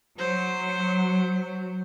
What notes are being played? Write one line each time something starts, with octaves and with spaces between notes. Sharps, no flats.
F#3 C5